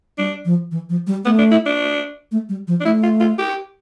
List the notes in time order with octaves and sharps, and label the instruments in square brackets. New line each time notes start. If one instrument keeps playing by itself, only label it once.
[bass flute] G3 [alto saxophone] D4
[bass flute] F3
E3
F3
G3
[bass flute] A3 [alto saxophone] B3
[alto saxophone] D4
E4
D4
[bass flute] A3
G3
F3
[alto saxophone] D4
[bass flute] A3 [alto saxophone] E4
[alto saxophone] F4
F4
G4